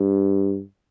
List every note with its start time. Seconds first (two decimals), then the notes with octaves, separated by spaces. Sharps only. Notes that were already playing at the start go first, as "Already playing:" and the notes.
Already playing: G2